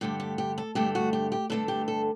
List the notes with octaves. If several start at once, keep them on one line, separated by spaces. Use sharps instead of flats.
G2 D3 A3 G4
G4
G4
A4
G2 D3 A3 G4
F#4
G4
G4
G2 D3 A3 A4
G4
A4